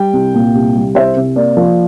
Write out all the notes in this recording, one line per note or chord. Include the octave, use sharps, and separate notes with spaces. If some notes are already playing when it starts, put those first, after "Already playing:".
Already playing: G3 G5
C2
A#2
C2
G3
C2 C5 E5
C3
A#3 D5
F3